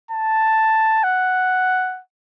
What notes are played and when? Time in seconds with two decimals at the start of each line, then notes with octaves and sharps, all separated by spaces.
0.11 A5
1.04 F#5